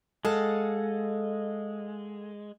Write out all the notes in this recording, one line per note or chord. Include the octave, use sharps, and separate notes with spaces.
G#3 A4 F5 F#5